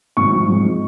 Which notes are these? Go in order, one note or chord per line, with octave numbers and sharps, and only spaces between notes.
G#1 C#6
F3
G#2
G#3